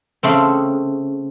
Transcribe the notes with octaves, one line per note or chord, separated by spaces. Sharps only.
C#3 A3 C4